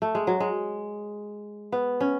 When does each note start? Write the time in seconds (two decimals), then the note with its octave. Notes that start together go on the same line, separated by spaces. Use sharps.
0.02 A3
0.15 G#3
0.27 F#3
0.40 G#3
1.72 B3
2.01 C#4